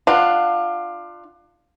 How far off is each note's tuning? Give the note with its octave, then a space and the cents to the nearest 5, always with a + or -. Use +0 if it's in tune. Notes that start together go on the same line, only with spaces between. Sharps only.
D4 +25 F4 +0 F#5 +0